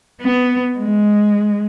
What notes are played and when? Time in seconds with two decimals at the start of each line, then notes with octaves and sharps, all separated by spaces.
0.21 B3
0.79 G#3